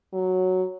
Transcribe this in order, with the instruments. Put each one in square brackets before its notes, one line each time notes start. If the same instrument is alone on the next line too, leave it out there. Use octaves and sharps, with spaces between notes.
[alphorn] F#3